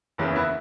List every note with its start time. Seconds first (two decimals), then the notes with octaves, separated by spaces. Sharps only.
0.18 F#1 E2 C#3 E3
0.36 B3 E4